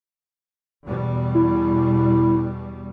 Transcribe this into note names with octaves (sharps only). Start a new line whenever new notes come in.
E2 B2 G3
E4